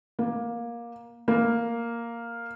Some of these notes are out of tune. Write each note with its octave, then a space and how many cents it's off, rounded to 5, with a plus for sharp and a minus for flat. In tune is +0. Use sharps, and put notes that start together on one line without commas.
A#3 +15
A#3 +0